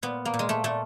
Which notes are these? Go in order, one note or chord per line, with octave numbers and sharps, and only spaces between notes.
A#2 B3
A#3
A#2
G#3
A3
A#2 A3